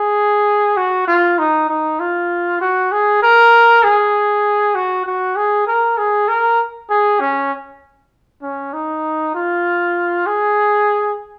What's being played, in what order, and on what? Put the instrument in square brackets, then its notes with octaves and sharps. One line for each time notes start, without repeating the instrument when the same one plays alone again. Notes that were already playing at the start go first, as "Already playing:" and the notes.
Already playing: [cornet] G#4
F#4
F4
D#4
D#4
F4
F#4
G#4
A#4
G#4
F#4
F#4
G#4
A#4
G#4
A#4
G#4
C#4
C#4
D#4
F4
G#4